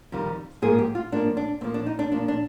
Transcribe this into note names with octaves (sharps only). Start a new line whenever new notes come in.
F2 D#3 G3
G#2 F3 A#3 G#4
G4
F4
G#2 F3 A#3 D4
D4
A#2 F3 A#3 C4
D4
D#4
D4
A#2 F3 A#3 D4
D4